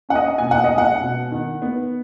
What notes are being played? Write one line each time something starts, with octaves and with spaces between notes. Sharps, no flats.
C#4 F#5
D#5
B2 G#5
F#5
D#5
G#3
F#5
B2
D#3
B3